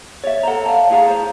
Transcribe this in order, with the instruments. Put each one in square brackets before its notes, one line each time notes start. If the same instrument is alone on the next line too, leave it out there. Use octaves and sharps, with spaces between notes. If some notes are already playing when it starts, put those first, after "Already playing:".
[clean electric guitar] C#5 [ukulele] D5 E5
[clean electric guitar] A4 A#5 [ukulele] C5 F#5
[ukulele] C#5 D5 [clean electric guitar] F5 A5
[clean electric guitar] A2 G#4 A#5 [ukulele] C#5 F5 F#5
[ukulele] C5